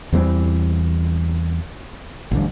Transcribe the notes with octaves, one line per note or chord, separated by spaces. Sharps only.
E2 E3 G3 C4
A1 D2 G2